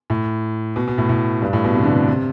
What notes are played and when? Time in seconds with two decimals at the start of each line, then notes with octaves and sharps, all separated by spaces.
0.10 A2
0.76 B2
0.87 B2
0.98 A2
1.09 A2
1.42 G2
1.53 A2
1.64 B2
1.75 C3
1.84 D3
1.91 C3
2.08 C3